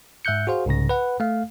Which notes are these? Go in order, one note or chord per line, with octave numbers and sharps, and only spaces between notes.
G#2 E5 F#6 G6 C#7
F#4 G#4 C5 F5
C2 G#2 C#3 A#6
B4 F#5
A3 F5